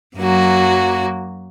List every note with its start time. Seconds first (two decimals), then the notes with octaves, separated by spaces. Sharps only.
0.17 F#2 F#3 A#3 F#4